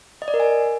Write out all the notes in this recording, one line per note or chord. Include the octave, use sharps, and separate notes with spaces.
D#5
D5
A#4
G#5